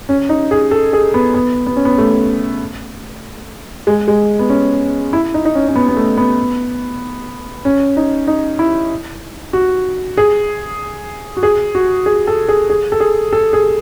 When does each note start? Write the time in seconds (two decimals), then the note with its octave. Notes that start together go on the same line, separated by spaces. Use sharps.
0.09 C#4
0.29 D#4
0.51 G#4
0.71 A4
0.93 G#4
1.14 B3
1.34 B3
1.67 B3
1.76 C#4
1.85 B3
1.98 A3
3.87 G#3
4.08 G#3
4.39 B3
4.49 C#4
5.13 E4
5.34 D#4
5.45 D#4
5.55 C#4
5.68 C#4
5.76 B3
5.88 B3
5.97 A3
6.17 B3
7.65 C#4
7.97 D#4
8.27 D#4
8.59 E4
9.53 F#4
10.17 G#4
11.37 F#4
11.43 G#4
11.75 F#4
12.06 G#4
12.27 A4
12.48 G#4
12.70 G#4
12.92 A4
13.00 G#4
13.33 A4
13.53 G#4